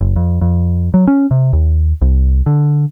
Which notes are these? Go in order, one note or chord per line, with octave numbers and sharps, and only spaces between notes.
F#1
F2
F2
F#3
C#4
C3
D#2
C2
D3